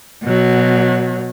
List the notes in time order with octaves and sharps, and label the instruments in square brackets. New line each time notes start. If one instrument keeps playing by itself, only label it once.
[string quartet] B2 F#3